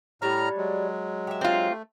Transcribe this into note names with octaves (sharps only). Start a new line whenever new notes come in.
A2 G3 D4 C#5 A#5 F6
F#3 G#3
G4 E5
C4 F4
A3